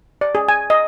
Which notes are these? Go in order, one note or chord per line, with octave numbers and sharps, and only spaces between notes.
D5
G#4
G#5
D#5